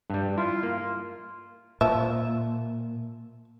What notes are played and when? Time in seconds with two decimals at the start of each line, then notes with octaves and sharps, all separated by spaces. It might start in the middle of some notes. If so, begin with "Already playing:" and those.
0.10 G2 G3
0.38 E4 F4
0.63 A#3
1.81 A#2 F3 E5